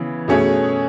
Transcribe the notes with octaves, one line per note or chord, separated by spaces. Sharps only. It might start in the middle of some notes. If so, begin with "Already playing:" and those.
Already playing: C#3 E3 B3
B2 A3 C#4 G#4